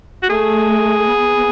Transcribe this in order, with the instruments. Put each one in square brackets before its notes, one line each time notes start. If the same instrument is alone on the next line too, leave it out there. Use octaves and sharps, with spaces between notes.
[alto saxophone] F#4
[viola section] A3 [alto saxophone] G#4
[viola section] B3